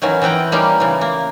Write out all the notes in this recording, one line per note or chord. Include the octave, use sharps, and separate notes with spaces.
D#3 E3 F#3 C#4
E3 C4 B4 G5 A#5
G3 A#3 C#4 D#4 F4 G4
C#3 E3
A#3